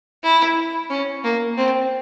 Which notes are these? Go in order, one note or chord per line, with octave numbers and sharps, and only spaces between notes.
E4
C#4
A#3
C4